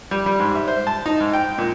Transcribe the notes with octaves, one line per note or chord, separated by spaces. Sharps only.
G3
G3
G#2
E5
C5
A5
D#4
G#2
G5
A#2